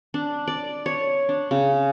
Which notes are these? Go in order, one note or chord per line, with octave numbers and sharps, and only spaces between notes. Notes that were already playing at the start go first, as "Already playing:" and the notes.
D4
D5
C#5
D4
C#3